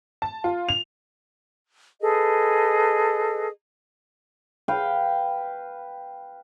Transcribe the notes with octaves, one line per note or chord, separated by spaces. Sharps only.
A5
F4
F7
G#4 A4 B4 D#5
B4 F5 G5